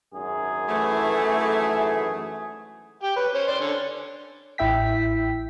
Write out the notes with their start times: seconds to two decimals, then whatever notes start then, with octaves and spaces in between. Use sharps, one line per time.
0.14 G#1 F#2 G#4
0.69 E3 A3
3.03 G4 G5
3.16 B4 C#5
3.34 C#4 C5 C#5
3.48 D5 C6
3.60 D3 C#4
4.58 A1 E4 E5 G5 B6